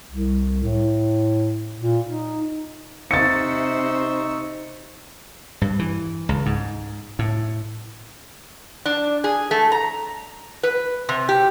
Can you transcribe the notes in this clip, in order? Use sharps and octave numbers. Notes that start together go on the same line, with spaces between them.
C2
A2
A#2
D#4
C3 D#4 C5 C#6 E6 A6 C#7
G2
E3
C#2
G#2
A2
D4
G#4
A3
A#5
B4
C3
G4